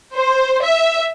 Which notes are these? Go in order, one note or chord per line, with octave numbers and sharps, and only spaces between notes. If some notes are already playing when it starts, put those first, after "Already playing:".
C5
E5